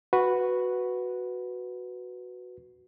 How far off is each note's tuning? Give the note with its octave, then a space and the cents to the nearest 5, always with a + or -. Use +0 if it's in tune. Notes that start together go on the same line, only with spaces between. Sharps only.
F#4 -5 B4 +0